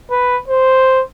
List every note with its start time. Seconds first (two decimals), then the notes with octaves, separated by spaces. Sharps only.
0.11 B4
0.48 C5